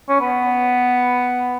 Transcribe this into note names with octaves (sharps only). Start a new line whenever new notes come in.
C#4
B3